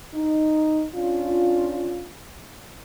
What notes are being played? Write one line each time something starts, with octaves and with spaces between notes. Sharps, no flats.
D#4
C#4 D4 F4